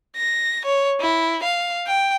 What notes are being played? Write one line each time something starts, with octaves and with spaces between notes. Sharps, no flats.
A#6
C#5
E4
F5
G5